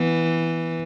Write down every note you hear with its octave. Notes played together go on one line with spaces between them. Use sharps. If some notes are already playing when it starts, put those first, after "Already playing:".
Already playing: E3 B3